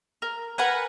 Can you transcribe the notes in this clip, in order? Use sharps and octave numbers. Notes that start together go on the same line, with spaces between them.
A#4
A#4 B4 F#5 G#5